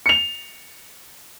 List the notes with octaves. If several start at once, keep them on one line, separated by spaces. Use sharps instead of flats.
C#7 F7